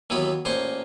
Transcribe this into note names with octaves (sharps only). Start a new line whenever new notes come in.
D#2 E3 F#3 B3 B5
A1 A#2 C5 G#5 C#6